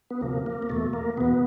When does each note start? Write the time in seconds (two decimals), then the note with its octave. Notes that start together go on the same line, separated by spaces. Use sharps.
0.10 B3
0.21 D2 C3 F3 A#3
0.46 A#3
0.62 A#3
0.69 E2 B2 A3
0.93 A#3
1.17 E2 B2 B3